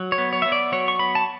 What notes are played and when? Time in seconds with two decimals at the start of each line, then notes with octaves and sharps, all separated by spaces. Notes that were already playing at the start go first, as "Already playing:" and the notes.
Already playing: F#3
0.12 C#5
0.18 B3
0.33 C#5
0.42 B3 E5
0.52 D5
0.72 F#3 C#5
0.88 C#6
0.99 B3 B5
1.15 A5